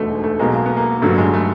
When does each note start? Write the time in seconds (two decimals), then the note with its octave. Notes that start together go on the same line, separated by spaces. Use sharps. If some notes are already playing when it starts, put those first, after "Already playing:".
Already playing: E1 D2 D3 A3 D#4
0.08 G#3
0.24 A3
0.39 B1 B2 G#3 A#3
0.55 A#3
0.66 B3
0.77 A#3
1.02 G1 G2 D3 F#3 A3
1.18 G#3
1.34 A3